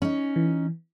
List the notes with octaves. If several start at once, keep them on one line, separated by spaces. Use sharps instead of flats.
C#4 D#4
E3